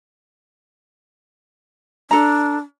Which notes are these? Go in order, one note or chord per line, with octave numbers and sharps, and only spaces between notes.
D4 A4 A#5